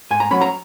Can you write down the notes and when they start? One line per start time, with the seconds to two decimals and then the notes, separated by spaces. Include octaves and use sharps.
0.11 G#2 G#5
0.20 A#5
0.31 F#3 C#4 B5
0.41 A#5